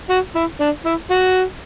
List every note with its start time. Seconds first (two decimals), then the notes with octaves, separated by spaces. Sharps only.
0.10 F#4
0.36 E4
0.61 D4
0.85 E4
1.11 F#4